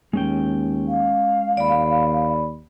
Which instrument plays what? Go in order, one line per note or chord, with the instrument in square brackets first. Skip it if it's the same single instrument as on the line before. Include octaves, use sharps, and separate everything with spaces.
[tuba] D#2 [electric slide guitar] G#3 C#4 G5
[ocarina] F5
[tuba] D#2 [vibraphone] D5 B5